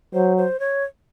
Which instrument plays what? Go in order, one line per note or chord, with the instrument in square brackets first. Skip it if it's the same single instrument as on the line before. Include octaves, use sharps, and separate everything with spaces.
[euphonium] F#3 [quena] C5
[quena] C5
C#5